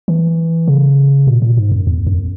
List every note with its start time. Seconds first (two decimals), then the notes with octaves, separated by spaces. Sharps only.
0.08 E3
0.68 C#3
1.27 A#2
1.42 A#2
1.57 G#2
1.72 F#2
1.87 E2
2.07 F#2